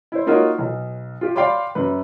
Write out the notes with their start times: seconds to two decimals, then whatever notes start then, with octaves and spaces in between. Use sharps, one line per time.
0.12 E4 C5
0.26 A#3 D#4 F4 F#4 A#4 C#5
0.59 B1
1.21 F4 G4
1.36 D5 F5 G5 B5 C6 D6
1.75 F#2 B4